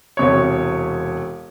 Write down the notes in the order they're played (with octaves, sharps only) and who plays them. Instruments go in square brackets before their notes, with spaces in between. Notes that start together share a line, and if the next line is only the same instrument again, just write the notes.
[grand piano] E1 C3 C#5